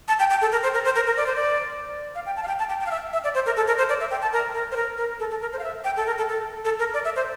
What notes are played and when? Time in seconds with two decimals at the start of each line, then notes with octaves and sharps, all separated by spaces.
0.08 A5
0.19 G5
0.30 G5
0.42 A4
0.52 A#4
0.63 C5
0.74 A#4
0.85 C5
0.96 A#4
1.07 A#4
1.17 D5
1.27 C5
1.36 D5
2.15 F5
2.26 G5
2.37 A5
2.43 F5
2.48 G5
2.59 A5
2.69 G5
2.80 G5
2.86 F5
2.91 E5
3.13 E5
3.24 D5
3.35 C5
3.46 A#4
3.57 A4
3.68 A#4
3.78 C5
3.89 D5
4.01 E5
4.11 G5
4.22 A5
4.33 A#4
4.55 A#4
4.72 C5
4.76 A#4
4.98 A#4
5.20 A4
5.30 A4
5.41 A#4
5.53 C5
5.59 F5
5.64 E5
5.84 G5
5.97 A4
6.07 A#4
6.18 A4
6.29 A4
6.65 A4
6.79 A#4
6.94 D5
7.05 E5
7.16 C5